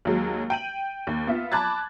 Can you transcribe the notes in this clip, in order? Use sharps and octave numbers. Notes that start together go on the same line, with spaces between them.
D#2 F#3 G#3
G5 D#7 F#7
D#2
B3 F4 E5
A5 B5 D6 F#6 G#6 A6